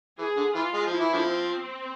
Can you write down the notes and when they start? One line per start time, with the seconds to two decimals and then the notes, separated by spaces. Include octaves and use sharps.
0.18 E3 G#4
0.37 D3
0.55 E3 F4
0.74 G#3
0.86 F3
0.92 E4
1.00 E3
1.13 D3 F3
1.29 C4